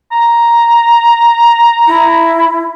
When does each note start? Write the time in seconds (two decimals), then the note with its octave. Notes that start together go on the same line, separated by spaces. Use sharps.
0.12 A#5
1.87 E4